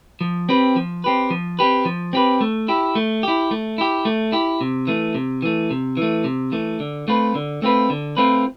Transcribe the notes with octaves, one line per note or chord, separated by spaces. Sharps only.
F3
C4 G4 B4
F3
C4 G4 B4
F3
C4 G4 B4
F3
C4 G4 B4
A3
E4 G4
A3
E4 G4
A3
E4 G4
A3
E4 G4
C3
E3 A3
C3
E3 A3
C3
E3 A3
C3
E3 A3
D3
A3 C4 F4 B4
D3
A3 C4 F4 B4
D3
A3 C4 F4 B4